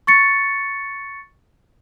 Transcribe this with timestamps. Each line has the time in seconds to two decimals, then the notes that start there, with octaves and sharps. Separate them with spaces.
0.07 C#6 A6 C#7